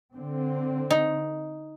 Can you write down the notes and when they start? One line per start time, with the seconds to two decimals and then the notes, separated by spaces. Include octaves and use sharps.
0.13 D3 C4
0.91 D#4